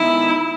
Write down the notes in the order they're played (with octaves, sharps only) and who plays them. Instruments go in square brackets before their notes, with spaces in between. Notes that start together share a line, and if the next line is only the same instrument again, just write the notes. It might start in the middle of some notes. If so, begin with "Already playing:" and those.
Already playing: [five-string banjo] D#3 G#3 B3 D#4 [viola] E4